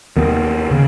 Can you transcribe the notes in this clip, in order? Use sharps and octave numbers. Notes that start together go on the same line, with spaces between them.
D#2 D#3 B3
C#3